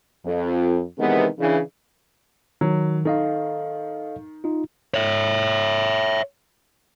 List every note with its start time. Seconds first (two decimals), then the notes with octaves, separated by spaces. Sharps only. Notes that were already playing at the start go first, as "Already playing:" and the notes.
0.24 F2
0.99 C3 D#3 E3 G#3 B3
1.39 C#3 E3 D4
2.61 D#3 F#3
3.05 D#3 A4 D#5 F5
4.44 D#4 F4
4.94 C#5 E5